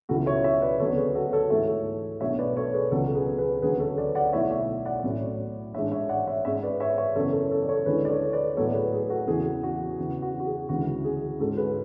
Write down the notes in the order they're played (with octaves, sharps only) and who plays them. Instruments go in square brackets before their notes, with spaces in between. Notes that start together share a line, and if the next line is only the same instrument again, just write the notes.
[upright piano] C#2 B2 F#3 B3 E4 F#4 A4
C#5 E5
C#5 E5
B4 D5
D2 C#3 F#3 B3 A4 C#5
G#4 B4
F#4 A4
A4 C#5
G#2 E3 A3 C#5 E5
B1 B2 A3 D4 C#5 E5
B4 D5
A4 C#5
G#4 B4
C#2 B2 F#3 F#4 A4
G#4 B4
G#4 B4
D2 C#3 F#3 G#4 B4
A4 C#5
B4 D5
D5 F#5
B1 B2 A3 E4 C#5 E5
C#5 E5
D5 F#5
A2 F#3 C#4 E4
A1 G#2 G#3 D4 C#5 E5
C#5 E5
D5 F#5
C#5 E5
G#2 G#3 C#4 C#5 E5
B4 D5
C#5 E5
C#5 E5
F#2 C#3 E3 B3 A4 C#5
A4 C#5
A4 C#5
D5
A4 C#5
D2 D3 G#3 C#4 E4 G#4 B4
D5
A4 C#5
B4 D5
A2 F#3 B3 A4 C#5
G#4 B4
G#4
F#4 A4
E2 C#3 E3 G#4
F#4
E2 C#3 E3
F#4
F#4
G#4
D2 C#3 E3 G#3 F#4
G#4
G#2 G#3 C#4 F#4 A4
G#4 B4